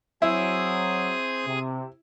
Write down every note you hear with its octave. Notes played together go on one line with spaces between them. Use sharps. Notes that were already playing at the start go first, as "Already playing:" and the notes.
F#3 C4 E4 G#4 C5 D#6
C3